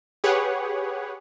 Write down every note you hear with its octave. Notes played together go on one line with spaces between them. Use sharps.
G4 G#4 B4 C#5 F#5